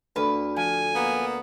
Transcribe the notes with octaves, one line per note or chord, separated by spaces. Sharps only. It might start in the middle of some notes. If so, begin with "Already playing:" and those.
D2 B4
F3 G#5
A#3 B3